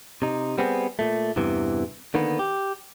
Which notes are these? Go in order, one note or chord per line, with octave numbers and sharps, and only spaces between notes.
C3 D#4
G3 B3 C4 E4 G#4
A#2 A3
E2 G2 C3 E3
D3 D#3 A#3 B3
G4